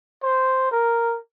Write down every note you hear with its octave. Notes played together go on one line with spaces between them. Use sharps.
C5
A#4